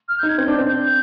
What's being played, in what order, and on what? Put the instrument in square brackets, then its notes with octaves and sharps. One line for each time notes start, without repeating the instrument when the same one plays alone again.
[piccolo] F6
G6
[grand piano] D#4
[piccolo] G#6
[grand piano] C4 [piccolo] G6
[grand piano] D4
C4
[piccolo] G6